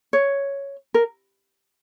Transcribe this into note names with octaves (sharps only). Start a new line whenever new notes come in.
C#5
A#4